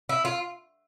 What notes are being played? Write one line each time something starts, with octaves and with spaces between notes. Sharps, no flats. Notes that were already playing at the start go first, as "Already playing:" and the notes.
E4
F4